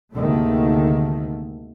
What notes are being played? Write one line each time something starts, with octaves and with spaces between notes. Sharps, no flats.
D2 G#2 C3 D#3 A3 A#3